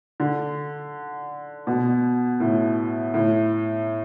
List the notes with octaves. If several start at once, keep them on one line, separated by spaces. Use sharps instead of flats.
D3
B2
A2
A2